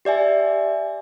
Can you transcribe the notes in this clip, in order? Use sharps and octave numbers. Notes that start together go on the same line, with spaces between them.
G4 D5 E5 G#5